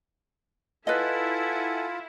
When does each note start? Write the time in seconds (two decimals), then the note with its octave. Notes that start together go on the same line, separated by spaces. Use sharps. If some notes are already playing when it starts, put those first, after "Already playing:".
0.87 E4 F4 A4 B4 D#5 F#5 G#5